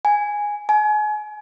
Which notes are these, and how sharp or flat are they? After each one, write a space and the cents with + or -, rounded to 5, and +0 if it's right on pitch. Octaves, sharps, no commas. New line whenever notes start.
G#5 -5
G#5 +35